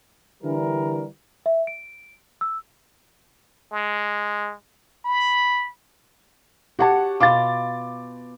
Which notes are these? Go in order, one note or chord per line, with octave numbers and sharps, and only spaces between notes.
D3 E3 G3 A#4
E5
D7
E6
G#3
B5
F#4 G4 C#5 F#5 A5
B2 F4 F5 D6 A6